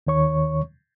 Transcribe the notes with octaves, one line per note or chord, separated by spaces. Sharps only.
D#2 D#3 C#5 C#6